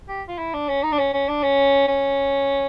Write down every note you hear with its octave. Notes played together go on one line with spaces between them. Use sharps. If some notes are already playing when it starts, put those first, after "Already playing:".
G4
F4
E4
D4
C#4
D#4
D4
C#4
C#4
D4
C#4
C#4